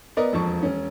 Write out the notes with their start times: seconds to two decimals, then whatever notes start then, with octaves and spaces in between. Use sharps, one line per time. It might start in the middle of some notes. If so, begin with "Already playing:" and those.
0.17 B3 A#4 D5 D#5
0.32 E1 F2 F3 A5 C#6
0.63 E1 C#4